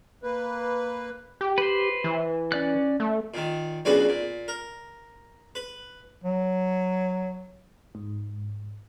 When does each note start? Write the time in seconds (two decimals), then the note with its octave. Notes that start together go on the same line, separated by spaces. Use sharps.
0.23 A#3 B4
1.41 G4
1.58 B4 C5
2.04 E3
2.52 C#4 D5 F#6
3.00 A3
3.34 A#2 D#3
3.85 B1 A#2 C#3 D4 F#4 B4
4.09 A#2
4.48 A#4
5.55 B4
6.24 F#3
7.95 G#2